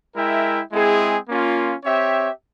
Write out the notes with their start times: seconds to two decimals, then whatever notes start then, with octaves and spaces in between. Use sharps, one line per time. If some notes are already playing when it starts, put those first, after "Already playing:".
0.16 G#3 E4 A#4 E5 G5
0.73 G#3 C4 E4 G#4
1.29 A#3 C#4 F4
1.85 C4 G4 C#5 E5